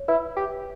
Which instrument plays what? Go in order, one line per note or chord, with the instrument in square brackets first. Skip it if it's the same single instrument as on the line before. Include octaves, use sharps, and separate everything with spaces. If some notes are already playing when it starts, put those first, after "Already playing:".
Already playing: [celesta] C#5
[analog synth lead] E4 [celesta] B4
[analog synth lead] G4